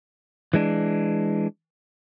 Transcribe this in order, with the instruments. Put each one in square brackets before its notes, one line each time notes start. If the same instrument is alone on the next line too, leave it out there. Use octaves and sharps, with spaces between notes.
[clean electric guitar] E3 G#3 D4